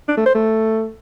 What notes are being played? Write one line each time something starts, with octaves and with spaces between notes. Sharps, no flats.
D4
A3
C5
A3